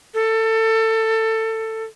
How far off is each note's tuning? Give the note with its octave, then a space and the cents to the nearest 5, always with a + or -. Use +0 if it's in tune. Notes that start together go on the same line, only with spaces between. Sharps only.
A4 +20